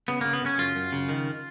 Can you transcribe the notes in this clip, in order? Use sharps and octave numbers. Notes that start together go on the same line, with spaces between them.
C#3 B3
C#3 A#3
B3
C#3 C#4
F#2 F4
F#2
C#3
D#3